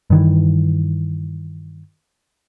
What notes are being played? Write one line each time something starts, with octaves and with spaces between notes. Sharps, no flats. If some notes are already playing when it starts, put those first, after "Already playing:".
G2 D#3 E3